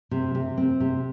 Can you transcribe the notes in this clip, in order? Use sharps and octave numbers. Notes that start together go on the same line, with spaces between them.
C3
C3
C4
C3